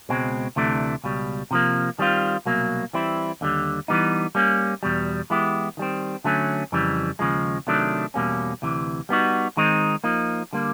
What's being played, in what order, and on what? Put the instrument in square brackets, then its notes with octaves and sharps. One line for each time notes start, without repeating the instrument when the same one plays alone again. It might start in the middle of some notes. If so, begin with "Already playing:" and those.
[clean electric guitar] C#2 B2 G#3 C4
D2 C3 E3 A3 D4
C#2 B2 G3
C3 F3 A#3
D#3 G3 C4 F4
C2 B2 F#3 A#3
E3 G3 C4 E4
D#2 D3 G3
E3 G3 B3 D#4
G3 A#3 C#4
E2 B2 G3
E3 G#3 B3 E4 G4
D#3 G3 C4
D3 F#3 A3 C#4
F2 C#3 E3 G3
D#2 C#3 F3 G#3
C3 D#3 F#3 A3 D4
E2 B2 G3 A#3 C#4
D2 C3 E3
G3 B3 D#4 F#4
D#3 G#3 C4 D#4
F3 A#3 D#4
D3 G3 A#3